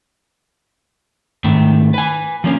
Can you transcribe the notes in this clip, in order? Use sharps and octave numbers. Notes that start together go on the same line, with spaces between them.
G#2 D#3 A3
B4 G#5
F3 A#3 C#4